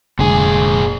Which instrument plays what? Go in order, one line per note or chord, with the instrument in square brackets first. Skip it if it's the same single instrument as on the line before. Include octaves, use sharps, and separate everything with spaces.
[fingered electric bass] F1 D3 G#3 [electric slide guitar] A#2 G#4